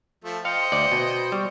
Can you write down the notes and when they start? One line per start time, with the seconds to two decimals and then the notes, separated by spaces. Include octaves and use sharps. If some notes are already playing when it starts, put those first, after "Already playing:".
0.24 F3 A3
0.45 C5 D#5 F5 G5 C#7
0.72 D2 D5
0.92 B2
1.16 B5
1.32 G3 C#6